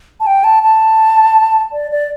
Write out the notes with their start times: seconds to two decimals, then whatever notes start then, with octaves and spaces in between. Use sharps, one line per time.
0.20 A5
0.27 G5
0.44 A5
0.63 A5
1.72 D5
1.91 D5